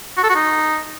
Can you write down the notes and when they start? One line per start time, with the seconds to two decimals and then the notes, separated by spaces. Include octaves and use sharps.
0.17 F#4
0.23 A4
0.29 F#4
0.35 D#4